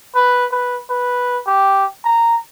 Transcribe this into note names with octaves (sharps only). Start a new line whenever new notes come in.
B4
B4
B4
G4
A#5